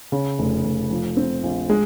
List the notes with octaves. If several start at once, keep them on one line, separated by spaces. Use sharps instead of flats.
C#3
F1
F1
F3
C4
A#1
G#3